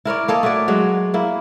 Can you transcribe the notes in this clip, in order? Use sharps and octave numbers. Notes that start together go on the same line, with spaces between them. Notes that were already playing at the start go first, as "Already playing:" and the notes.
E4 A#4 C#5 D5
A#3 A4 C#5 D#5
A3 F#4 D5
F#3 G#3
A#3 E4